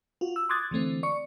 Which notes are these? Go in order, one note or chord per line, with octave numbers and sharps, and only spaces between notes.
F4 F#4
E6
C6 D6 D#6 F#6 G#6 A6
D3 E3 A3 C4
D5 C#6 C#7